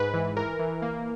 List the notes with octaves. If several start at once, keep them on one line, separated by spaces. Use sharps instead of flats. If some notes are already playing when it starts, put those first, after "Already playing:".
Already playing: G#2 B4
E3
E3 A#4
E3
A#3